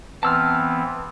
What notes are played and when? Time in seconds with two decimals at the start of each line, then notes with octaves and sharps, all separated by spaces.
0.23 E3 B3 C4 A5 E6 F6